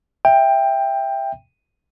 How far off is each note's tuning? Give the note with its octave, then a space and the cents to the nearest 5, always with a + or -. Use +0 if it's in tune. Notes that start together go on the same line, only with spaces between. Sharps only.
E5 +0 G5 +15